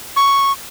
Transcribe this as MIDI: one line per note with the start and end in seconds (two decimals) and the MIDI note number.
0.16 0.52 85